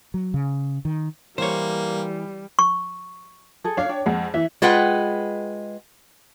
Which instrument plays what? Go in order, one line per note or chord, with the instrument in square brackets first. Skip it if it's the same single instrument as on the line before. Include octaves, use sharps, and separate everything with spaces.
[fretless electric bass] F#3
C#3
D#3
[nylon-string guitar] E3 [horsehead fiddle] G3 [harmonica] A#3 [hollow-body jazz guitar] C5 C#5
[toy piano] C#6
[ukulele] G#4 A4
[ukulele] D4 F5 [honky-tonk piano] C#5
[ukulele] D4 G5
[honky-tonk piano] F2 G#3 [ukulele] F#5
[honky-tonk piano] E3 [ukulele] E5
[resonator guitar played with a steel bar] G#3 F4 B4 F#5 G5